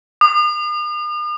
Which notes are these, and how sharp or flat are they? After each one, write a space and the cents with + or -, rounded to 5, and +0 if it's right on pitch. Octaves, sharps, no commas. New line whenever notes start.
D#6 -45